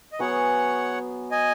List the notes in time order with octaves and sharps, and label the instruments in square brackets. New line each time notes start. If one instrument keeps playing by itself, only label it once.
[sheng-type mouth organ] D#5
[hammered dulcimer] F#3 B3 G#4 [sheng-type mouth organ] C#5 F#5
[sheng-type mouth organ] D#5 G#5